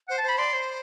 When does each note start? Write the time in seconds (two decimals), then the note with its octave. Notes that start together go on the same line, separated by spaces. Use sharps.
0.09 C5 F#5
0.18 A5
0.23 C5
0.29 B5
0.38 D5 C6
0.53 C5